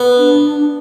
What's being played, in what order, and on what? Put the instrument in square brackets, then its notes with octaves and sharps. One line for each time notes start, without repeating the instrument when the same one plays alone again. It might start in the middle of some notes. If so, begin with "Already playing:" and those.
Already playing: [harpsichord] B3
[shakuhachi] D4